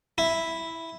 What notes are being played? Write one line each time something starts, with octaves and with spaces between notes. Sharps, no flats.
E4